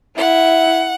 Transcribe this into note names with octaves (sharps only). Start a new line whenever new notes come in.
E4 F#5